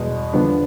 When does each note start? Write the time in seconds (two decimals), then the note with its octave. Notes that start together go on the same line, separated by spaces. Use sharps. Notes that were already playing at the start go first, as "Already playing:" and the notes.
Already playing: E2 B2 G#3
0.33 E2 D3 F3 B3 D4